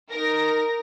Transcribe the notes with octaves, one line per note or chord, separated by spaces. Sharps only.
D#4 A#4 A#6